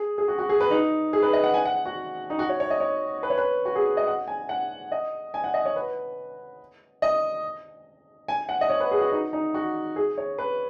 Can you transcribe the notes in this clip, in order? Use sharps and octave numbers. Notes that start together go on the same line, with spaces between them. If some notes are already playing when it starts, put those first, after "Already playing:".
Already playing: G#4
G#4
F#4
F#4
G#4
B4
D#4
G#4
B4
D#5
F#5
G#5
F#5
F#4
D#4
F#4
C#5
C#5
D#5
C#5
B4
C#5
B4
F#4
G#4
D#5
F#5
G#5
F#5
D#5
G#5
F#5
D#5
C#5
B4
D#5
G#5
F#5
D#5
C#5
B4
G#4
F#4
D#4
D#4
F#4
G#4
C#5
B4